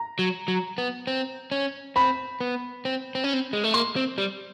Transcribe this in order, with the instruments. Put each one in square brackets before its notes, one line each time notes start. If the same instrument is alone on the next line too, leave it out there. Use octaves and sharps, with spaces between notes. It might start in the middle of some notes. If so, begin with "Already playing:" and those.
Already playing: [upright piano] A#5
[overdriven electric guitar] F#3
F#3
B3
C4
C#4
[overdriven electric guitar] C4 [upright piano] B5
[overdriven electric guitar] B3
C4
C4
C#4
C4
G#3
A3
[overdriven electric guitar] A#3 [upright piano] C6
[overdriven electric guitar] C4
G3